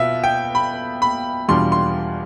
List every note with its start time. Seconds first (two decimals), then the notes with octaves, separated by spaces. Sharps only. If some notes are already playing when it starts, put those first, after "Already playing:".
Already playing: B2 B3 F4 E5
0.24 G5
0.55 B5
1.02 B5
1.48 E2 B2 G3 D4 F4 C6
1.72 C6